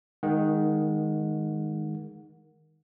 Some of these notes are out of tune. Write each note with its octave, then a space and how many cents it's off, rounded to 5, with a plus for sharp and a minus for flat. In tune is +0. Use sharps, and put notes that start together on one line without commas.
D#3 +5 G#3 +0 F#5 -25